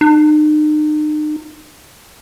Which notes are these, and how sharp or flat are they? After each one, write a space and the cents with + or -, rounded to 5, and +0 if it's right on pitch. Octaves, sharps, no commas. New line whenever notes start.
D#4 -40